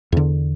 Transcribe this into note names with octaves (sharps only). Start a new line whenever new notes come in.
E2 D3